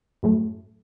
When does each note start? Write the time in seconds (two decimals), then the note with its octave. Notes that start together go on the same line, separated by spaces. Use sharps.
0.23 F#2 A2 F#3 A3